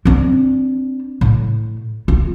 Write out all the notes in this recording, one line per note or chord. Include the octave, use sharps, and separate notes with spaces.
C4 D4
A2
F4